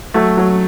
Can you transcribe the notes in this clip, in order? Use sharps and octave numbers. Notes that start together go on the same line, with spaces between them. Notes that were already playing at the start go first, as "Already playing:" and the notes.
F#3 A3
F#3